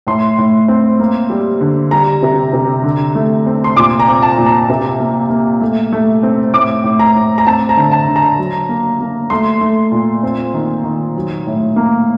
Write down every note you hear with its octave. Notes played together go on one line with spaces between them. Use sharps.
A2 C6
A2
C4
A#3
G3
D3
G3 A#5
C3
C3
D3
A3
C4
C6
A#2 D6
A#5
C4
A5
A#2
A#5
C3
A#3
A#3
A3
A3
C4
A2 D6
A2
A#5
A2
A#5
C4 A5
A#5
D3
A5
D3
A#5
F#3
A#3
A#3
A3 C6
A3
A#2
C4
D#3
D#3
F#3
A2
A#3